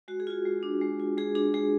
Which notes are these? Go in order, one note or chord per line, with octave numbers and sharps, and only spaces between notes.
G#3 F#4
G#4
F4 F#4
G#3
D4
G#3
F4
G#3 G#4
D4 G#4
G#3 G#4